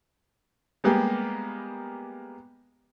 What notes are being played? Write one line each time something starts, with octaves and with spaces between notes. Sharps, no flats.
G3 G#3 A#3 B3 G4